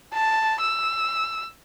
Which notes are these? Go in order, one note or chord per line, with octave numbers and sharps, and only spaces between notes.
A5
E6